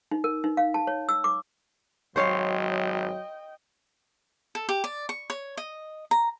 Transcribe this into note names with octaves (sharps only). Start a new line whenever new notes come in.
D#4
A#4
D#4
F5
A5
C#5
E6
D6
G#1 F#3 C5 C#5 D#5 F5 G5
A4
G4
D5
C#6
C#5
D#5
A#5